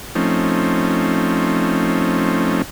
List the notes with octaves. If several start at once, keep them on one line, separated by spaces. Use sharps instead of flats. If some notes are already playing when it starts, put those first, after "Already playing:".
F3 A3 C4 C#4 D#4